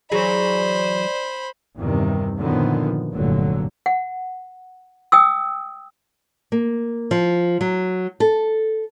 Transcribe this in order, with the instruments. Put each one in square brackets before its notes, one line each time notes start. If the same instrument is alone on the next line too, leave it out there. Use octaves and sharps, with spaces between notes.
[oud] E3 F#3 G#4 [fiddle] C5 B5 [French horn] D5
[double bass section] E2 G2 C3 D#3 G3
F#2 A#2 D3 D#3 F3 B3
F1 G2 A#2 D3 F#3
[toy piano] F#5
G5 D#6 E6
[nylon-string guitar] A#3
F3
F#3
A4